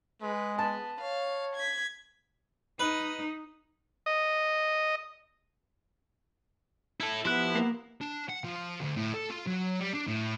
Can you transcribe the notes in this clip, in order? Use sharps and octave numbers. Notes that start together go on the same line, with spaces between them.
G#3 B4
B3 A5
C#5 F5
G#6 B6
D#4 B4
D#5
E4 A4
F3 B3 E4 G4 F#6
A#3
D4
F#5
F3
D2
A2
A4
F4
F#3
G3
D4
A2